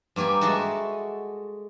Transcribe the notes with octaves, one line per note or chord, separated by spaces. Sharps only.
G2 A#3 G4 G#5
G#3 F#4 A4 E5 A5